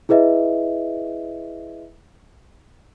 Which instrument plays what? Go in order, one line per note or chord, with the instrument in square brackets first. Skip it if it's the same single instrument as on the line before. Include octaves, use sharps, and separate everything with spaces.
[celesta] E4 G#4 B4 D#5 E5